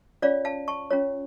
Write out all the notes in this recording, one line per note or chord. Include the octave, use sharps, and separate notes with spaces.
C#4 F4 C#5 D5 F5
F5 A5
A5 C#6
C#4 F4 C#5